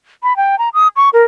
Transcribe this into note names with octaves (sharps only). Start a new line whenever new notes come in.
B5
G5
A#5
D#6
C#6
A#4